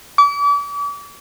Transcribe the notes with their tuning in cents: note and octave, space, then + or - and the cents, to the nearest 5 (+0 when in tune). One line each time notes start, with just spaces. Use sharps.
D6 -40